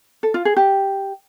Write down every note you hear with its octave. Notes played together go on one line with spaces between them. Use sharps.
A4
F4
G#4
G4